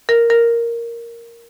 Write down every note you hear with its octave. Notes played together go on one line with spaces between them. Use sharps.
A#4
A#4